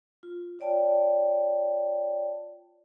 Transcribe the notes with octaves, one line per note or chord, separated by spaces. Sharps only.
F4
F4 C#5 D5 G5 A5